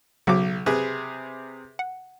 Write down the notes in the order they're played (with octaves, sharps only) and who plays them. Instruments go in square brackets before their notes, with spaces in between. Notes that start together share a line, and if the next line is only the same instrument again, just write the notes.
[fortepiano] B1 D6 [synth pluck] C#3 F#3 F#4
[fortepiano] C3 G#4 B4
[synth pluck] F#5